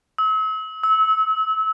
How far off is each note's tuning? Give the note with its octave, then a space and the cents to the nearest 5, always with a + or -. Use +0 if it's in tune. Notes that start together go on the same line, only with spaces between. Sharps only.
E6 -40
E6 -25